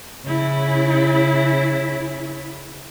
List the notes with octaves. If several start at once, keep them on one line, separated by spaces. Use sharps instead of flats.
C#3 E4